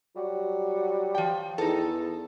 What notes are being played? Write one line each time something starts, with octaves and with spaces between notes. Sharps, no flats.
F#3 G3 F#4
F3 G5
E2 D#4 A4